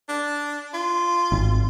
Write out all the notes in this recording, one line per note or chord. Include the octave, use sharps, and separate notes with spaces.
D4
F4
G#1